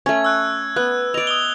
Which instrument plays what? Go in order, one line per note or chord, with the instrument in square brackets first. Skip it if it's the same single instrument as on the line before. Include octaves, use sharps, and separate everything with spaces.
[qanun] A3 C#4 [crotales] G#6
[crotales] E6 F#6
[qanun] B3 [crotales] F#6
[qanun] D5 D#5 [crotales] F7
[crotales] D#6 F7 G7